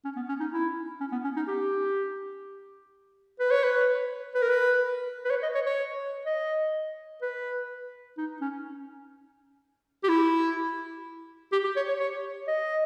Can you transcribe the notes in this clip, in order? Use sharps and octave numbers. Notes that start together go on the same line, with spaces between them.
C#4
B3
C#4
D#4
E4
C#4
B3
C#4
D#4
G4
B4
C#5
B4
B4
A#4
B4
B4
C#5
D#5
C#5
C#5
D#5
B4
D#4
C#4
G4
E4
G4
G4
C#5
C#5
C#5
D#5